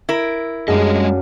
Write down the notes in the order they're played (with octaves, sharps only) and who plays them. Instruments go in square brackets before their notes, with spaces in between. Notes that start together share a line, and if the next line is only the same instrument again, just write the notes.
[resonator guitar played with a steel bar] E4 A#4
[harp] F#2 A#3 D4 [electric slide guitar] G3 G#3 D#5 [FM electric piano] G#4